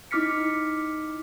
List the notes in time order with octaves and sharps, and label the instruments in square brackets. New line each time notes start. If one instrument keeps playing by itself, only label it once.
[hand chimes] D#4 E4 D6 F6 B6 C#7